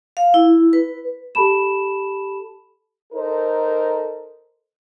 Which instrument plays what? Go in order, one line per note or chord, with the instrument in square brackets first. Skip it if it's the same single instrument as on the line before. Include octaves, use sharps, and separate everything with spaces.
[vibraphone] F5
E4
B4
[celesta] G4 A4 A5 B5 E7
[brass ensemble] D#4 A4 A#4 C5